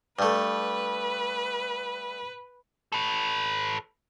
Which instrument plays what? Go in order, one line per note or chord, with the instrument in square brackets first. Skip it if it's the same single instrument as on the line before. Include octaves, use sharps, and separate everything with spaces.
[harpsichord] G2 A3 [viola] B4
[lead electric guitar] A4 B4